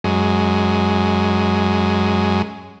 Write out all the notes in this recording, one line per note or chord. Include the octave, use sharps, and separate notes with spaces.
F#2 G#3